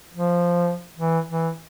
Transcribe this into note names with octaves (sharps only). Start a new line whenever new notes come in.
F3
E3
E3